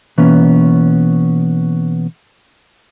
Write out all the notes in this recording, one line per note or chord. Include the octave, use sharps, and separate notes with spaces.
B2 E3 A#3 B3 C#4